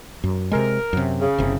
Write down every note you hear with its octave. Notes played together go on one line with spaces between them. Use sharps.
F#2
C3 G#3 A#4
F#2 C3
C#3
F#1 C3